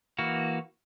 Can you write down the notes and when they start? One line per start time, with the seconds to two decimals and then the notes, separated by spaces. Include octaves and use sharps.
0.18 E3 A#3 F#4